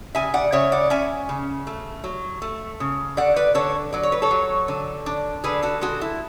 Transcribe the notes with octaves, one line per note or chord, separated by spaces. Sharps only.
C#3 E5 G#5
D5 F#5
C#3 C#5 E5
D5 F#5
C#4 E5 G#5
C#3
A3
F#3
A3
C#3
D3 D5 F#5
B4 D5
D3 A4 C#5
F#3 D5
C#5
B4
A4 C#5
F#3
D3
D4
D3 G#4 B4
F#4 A4
G#3 F#4 A4
E4